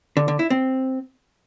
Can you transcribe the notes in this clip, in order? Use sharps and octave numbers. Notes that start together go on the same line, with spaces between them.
D3
D3
E4
C4